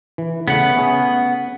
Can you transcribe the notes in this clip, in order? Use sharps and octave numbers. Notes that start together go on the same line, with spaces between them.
E3
C#3 A3 B3 F#5
C#4 G#4 G#5